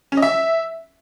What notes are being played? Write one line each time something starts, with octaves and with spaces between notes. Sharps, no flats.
C#4
D#5
E5